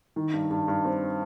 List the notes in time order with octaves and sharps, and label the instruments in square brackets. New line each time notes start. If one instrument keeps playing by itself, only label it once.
[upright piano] D#3
G2
G2
G2
C4